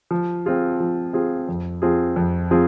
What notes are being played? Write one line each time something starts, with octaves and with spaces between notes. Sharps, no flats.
F3
C4 F4 G#4
F3
C4 F4 G#4
F2
F3 C4 F4 G#4
F2
F3 C4 F4 G#4